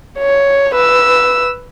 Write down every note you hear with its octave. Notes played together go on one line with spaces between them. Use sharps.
C#5
B4 E6